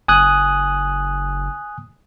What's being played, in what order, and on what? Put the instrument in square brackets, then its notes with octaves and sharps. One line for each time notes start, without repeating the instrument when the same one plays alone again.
[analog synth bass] F#1 [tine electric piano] G#5 D#6 F#6